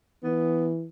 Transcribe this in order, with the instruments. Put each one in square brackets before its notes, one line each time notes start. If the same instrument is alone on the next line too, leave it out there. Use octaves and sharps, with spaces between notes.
[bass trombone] E3 [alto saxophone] B3